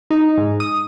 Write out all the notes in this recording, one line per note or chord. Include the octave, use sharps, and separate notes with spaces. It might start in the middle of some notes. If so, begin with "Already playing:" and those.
D#4
G#2
D#6